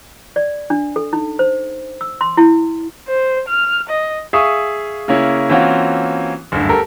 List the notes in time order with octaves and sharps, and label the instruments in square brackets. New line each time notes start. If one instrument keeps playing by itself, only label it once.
[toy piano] D5
D4
A4
D#4
C5
E6
C6
E4
[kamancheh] C5
F6
D#5
[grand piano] G#4 E5 F5 C#6 D#6
C#3 A#3 C#4 E4
E3 A#3 C4 C#4 F4 F#4
F#1 D2 G2
G4 A4 A#4